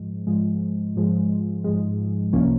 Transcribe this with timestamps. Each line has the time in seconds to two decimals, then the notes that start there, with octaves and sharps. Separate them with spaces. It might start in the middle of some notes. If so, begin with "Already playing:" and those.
Already playing: G#2 F3 G#3
0.27 G#2 F3 G#3
0.96 G#2 F3 G#3
1.64 G#2 F3 G#3
2.33 C2 C3 F3 A#3 C#4